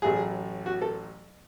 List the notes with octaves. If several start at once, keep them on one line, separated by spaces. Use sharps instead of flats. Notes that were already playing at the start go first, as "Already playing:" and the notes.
A1 A2 F#3 G#4
F#4
A4